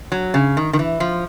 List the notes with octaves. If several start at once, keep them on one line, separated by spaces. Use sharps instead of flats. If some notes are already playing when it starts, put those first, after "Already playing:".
F#3
C#3
D#3
D#3
E3
F3